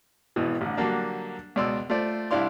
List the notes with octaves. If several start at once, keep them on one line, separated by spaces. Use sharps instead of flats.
G#1 B2 E3
A1 D3
D3 F#3 G3 A#3 D4
C#2 B2 D5 C6 E6
A3 F4 C5 D5
C2 D4 E4 D5 F5 C6